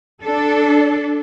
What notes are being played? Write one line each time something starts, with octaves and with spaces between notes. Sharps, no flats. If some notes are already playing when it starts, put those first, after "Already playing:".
D4 A4